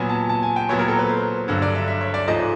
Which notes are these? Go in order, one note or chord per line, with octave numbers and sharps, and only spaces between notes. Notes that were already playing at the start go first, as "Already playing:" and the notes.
Already playing: A#2 F#3 B3 G#5
A5
A5
G#5
G5
A#2 F#3 B3 C#5
A#4
A4
B4
C5
G2 D3 F#3
D5
E5
E5
C#5
D5
G#2 F3 A3 D#5